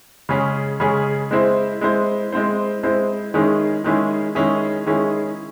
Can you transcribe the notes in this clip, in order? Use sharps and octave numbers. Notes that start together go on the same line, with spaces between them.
C#3 G#3 C#4 G#4
C#3 G#3 C#4 G#4
G#3 C4 E4 C5
G#3 C4 E4 C5
G#3 C4 E4 C5
G#3 C4 E4 C5
D#3 G#3 C#4 E4 G#4
D#3 G#3 C#4 E4 G#4
D#3 G#3 C#4 E4 G#4
D#3 G#3 C#4 E4 G#4